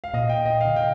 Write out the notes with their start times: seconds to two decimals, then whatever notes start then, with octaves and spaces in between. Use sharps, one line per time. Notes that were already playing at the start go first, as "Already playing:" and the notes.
0.04 F5
0.14 A#2 D#5
0.29 G5
0.46 D#5
0.61 F5
0.67 D3
0.76 C3 G5